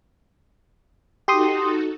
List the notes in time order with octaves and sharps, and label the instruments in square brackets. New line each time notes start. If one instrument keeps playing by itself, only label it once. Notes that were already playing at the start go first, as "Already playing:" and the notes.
[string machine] D#4 F#4 A4 [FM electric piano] G4 C6 D#6